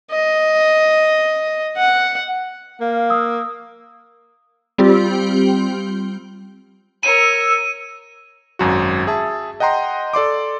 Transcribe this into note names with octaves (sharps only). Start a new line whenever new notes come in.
D#5
F#5
A#3 F5
D#6 E6
G3 C4 F4 G4
A#4 C#5 E6 D#7
G#1 F#2 F#4
G#4 E5 A5
D#5 F#5 G5 A#5 C6
A4 D5 C6 D6